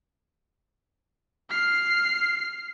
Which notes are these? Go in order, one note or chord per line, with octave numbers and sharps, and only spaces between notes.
F6 C7